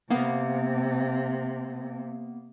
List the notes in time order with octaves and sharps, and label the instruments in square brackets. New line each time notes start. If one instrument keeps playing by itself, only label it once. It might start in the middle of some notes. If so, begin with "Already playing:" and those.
[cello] C3 [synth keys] A#3 B3